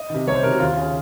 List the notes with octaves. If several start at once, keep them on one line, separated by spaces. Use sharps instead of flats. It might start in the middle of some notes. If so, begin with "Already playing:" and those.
Already playing: D#5
C3 D#3
C2 C#5
C5
C3 D#3 A#4
F#4
D#2 F4
C#3